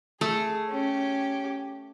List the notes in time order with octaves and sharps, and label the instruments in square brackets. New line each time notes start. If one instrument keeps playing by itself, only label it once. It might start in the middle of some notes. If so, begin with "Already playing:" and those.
[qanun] A3 [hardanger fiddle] G#4
[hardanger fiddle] C#4 G4